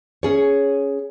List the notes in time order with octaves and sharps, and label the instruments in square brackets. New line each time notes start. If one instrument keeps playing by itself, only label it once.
[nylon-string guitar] C#4 G#4 C#5